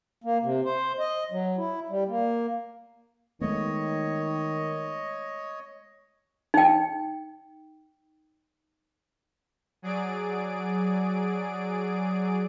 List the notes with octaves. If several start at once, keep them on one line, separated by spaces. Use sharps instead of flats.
A#3
C3
C5
D#5
F#3
E4
G3
A#3
D#3 G#3 A3 B3 C#5 D#5
D#4 G5
F#3 G#4 D5 D7